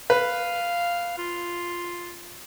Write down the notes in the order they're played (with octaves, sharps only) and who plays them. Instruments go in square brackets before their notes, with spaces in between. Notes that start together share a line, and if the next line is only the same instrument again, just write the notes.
[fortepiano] B4 [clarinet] F5
[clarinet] F4